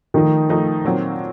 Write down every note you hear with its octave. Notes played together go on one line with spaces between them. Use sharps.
D#3 F3 A3 D#4
F3 A3 D#4
A#2 F#3 C4